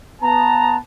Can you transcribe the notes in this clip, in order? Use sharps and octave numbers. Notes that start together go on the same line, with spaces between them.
B3 A5 A#5